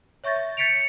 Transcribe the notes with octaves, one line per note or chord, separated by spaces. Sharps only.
C#5 E5 C#6 G6 A6 A#6
A6
G6 A6 B6 C#7 D7 F7